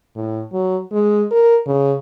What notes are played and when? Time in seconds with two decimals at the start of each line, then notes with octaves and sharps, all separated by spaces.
0.16 A2
0.52 F#3
0.91 G#3
1.31 A#4
1.66 C#3